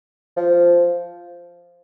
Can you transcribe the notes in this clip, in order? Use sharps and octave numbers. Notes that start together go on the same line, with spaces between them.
F3